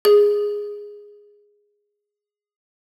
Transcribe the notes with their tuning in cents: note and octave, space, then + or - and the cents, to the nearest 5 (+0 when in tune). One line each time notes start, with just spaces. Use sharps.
G#4 -5